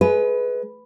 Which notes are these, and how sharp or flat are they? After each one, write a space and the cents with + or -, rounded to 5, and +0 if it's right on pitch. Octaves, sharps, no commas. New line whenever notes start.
G#3 +25 B4 +0